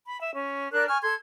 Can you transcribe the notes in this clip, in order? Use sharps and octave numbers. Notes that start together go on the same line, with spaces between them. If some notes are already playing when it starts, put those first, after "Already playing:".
B5
E5
C#4
D4 A#4 D5 F#6
G#5 C#6 F6
A4 C6 G#6